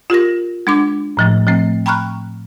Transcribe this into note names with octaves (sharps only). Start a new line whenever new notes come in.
F4 G4 A#4 A#6
G#3 D4 D6
A2 F3 A3
F3 A3 C4
G5 A#5 B5 C#6 F6 F#6